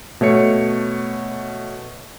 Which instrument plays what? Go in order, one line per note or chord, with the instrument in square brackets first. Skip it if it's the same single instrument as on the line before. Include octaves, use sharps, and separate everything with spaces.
[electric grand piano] B2 A3 C#5 C#7